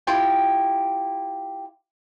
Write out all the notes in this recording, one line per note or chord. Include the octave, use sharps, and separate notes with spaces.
E4 F4 G4 G5